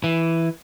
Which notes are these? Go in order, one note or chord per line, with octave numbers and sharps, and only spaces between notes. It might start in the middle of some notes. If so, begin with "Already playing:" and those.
E3